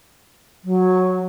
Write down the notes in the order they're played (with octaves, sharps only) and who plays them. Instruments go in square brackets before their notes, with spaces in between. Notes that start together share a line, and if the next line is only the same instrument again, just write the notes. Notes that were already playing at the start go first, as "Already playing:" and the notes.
[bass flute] F#3